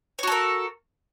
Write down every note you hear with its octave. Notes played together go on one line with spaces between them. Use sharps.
F#4 A4 A#4 C#5